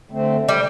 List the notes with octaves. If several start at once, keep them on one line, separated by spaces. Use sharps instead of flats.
D3 A3 C4
G3